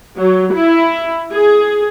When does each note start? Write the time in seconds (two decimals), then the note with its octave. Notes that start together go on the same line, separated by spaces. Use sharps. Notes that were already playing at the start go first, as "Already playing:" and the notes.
0.18 F#3
0.54 E4
1.33 G#4